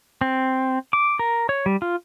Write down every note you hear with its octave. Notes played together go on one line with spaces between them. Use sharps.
C4
D6
A#4
C#5
G3
F4